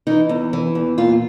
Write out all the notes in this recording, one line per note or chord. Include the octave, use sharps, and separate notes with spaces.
E3 D#4
E2
E3
E2
A#2 F4